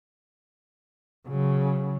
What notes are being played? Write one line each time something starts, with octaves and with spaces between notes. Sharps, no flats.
C#3 F#3